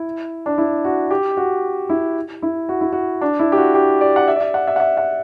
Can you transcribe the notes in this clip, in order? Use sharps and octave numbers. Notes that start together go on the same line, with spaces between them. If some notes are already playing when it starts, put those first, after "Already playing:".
Already playing: E4
D4
E4
F#4
G4
F#4
E4
E4
F#4
E4
F#4
D4
E4
G4
F#4
G4
D5
F#5
E5
D5
E5
F#5
E5
F#5
E5
F#5